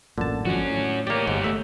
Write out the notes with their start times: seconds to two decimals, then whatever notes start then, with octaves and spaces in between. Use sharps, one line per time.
0.18 A1 F#2 A#2 D3 A5
0.45 G#1 F3 F#3 C#4 F#4
0.69 A2
1.07 A#3 G4 C#5 D5
1.27 G1 G#2
1.44 A3 E5